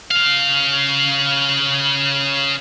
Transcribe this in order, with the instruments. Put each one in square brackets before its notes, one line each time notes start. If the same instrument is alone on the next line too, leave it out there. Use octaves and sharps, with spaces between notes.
[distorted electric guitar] C#3 F5